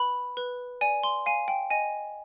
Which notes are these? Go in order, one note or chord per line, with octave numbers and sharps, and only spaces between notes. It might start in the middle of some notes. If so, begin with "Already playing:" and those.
Already playing: B4 B5
B4
D5 G#5
C6
F5 G#5
G5
D#5 G#5